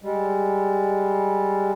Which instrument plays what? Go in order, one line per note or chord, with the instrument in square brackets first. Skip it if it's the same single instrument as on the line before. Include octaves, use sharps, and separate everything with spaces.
[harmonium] G3 G#3